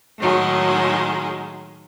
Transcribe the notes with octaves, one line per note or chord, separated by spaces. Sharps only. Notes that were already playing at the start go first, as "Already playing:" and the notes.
A2 D#3 F#3 G#3